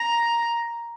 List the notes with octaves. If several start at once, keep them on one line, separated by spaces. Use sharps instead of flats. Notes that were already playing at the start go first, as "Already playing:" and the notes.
Already playing: A#5